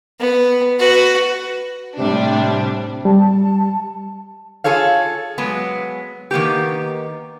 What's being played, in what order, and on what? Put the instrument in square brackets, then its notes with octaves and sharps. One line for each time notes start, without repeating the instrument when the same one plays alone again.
[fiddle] B3
F#4 B4
[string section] A2 G3 D4 [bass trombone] C3
[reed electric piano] G3 [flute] A5
[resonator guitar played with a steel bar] F4 G#4 A4 C#5 F5
F#3 G#3 B3
D#3 A#3 B3 G4